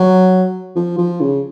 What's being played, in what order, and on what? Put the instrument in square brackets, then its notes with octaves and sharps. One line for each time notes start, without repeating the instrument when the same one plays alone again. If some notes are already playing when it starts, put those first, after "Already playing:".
Already playing: [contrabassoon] F#3
F3
F3
C#3